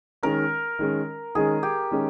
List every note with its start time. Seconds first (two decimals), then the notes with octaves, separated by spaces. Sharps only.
0.23 D#3 G#3 C#4 A#4
0.79 D#3 G#3 C#4
1.35 D#3 G#3 C#4 G#4
1.63 G4
1.91 D#3 G#3 C#4